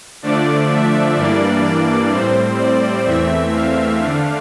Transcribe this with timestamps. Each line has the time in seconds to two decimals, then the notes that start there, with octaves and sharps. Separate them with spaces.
0.22 D3 F3 A3 D4 D5
0.70 E5
1.17 G2 E3 G3 A#3 D4 D5
1.64 D5
2.11 A2 G3 C4 C5
2.59 D5
3.06 E2 E3 A3 C4 E5
3.53 F5
3.99 D3 A3 D4